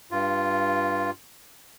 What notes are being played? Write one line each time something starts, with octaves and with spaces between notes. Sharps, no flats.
G2 F4